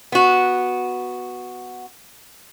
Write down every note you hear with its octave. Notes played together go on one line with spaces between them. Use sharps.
B3 F#4